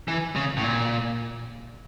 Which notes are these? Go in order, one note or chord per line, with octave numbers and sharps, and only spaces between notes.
E3
C#3
A2
A#2